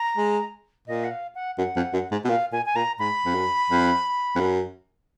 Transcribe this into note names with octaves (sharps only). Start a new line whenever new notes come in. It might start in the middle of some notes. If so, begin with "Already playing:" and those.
Already playing: A#5
G#3
A#2 D#5
F#5
F5
F#5
F#2 F#5
F2
F#2
G#2
B2
A#2 F5
A#2 G#5
G#5
A#2 A#5
G#2 B5
F2
F#2
F2
F2
F#2